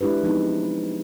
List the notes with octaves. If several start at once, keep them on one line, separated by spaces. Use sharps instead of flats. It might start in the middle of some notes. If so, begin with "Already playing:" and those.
G#3 D4 E4 G4 B4
F3 F#3 G#3 B3 C4 D#4